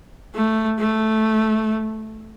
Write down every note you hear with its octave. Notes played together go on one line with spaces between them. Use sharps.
A3
A3